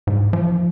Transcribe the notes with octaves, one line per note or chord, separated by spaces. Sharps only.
G#2
F3